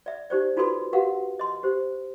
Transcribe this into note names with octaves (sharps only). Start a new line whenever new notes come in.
D5 E5
D#4 G4 C5 D5
D#4 F4 F#4 A4 B4 C6
F#4 G4 A#4 B4 F5 F#5
D#5 C6
G4 C5